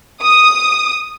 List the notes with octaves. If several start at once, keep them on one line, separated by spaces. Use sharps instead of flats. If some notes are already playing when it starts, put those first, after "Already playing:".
D#6